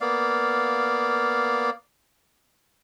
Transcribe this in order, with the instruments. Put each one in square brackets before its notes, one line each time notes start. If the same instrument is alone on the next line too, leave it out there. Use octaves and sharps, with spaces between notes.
[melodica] A#3 B3 D5 F5